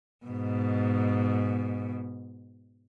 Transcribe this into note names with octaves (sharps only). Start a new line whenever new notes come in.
G#2 B2